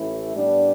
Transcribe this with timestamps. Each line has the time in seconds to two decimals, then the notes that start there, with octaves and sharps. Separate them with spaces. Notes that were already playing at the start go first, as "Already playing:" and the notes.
Already playing: A1 A2 E3 A3 E4
0.34 A2 G3 B3 D4